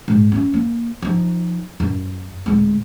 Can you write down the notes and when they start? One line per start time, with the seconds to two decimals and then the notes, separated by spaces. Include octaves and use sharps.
0.08 G#2
0.32 C4 C#4
0.54 A#3
1.02 F3 D#4
1.80 F#2
2.46 D1 G#3